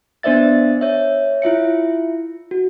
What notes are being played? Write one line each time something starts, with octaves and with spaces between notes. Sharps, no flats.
B3 D4 C5 D5 E5 A6
C#5 E5
E4 F4 E5 C#7
F#4